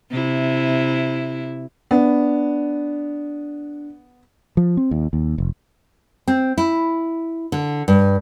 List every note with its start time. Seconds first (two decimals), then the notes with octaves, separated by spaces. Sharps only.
0.11 C3 E4
1.91 B3 D4
4.57 F3
4.77 C4
4.91 D#2
5.13 D#2
5.38 F1
6.28 C4
6.58 E4
7.52 D3
7.88 G2